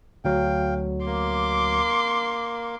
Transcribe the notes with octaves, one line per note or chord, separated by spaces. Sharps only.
D2 F#3 F5 G5
A#3 C6 D6